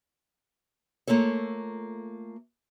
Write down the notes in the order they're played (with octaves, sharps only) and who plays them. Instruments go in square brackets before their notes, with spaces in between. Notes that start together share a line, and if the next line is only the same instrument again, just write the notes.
[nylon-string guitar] A3 A#3 F4 A4 C#5